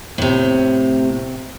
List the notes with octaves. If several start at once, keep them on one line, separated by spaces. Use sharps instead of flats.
A2 C3